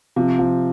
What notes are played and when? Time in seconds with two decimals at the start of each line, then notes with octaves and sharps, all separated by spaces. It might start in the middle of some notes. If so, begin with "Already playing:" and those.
0.16 C3 F3
0.39 F3